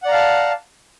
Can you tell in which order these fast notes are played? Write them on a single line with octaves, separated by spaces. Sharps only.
F#5 D5 A#5 F5 A5